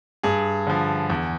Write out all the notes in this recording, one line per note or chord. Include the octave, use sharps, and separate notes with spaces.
G2 G#4
D3 F3
E2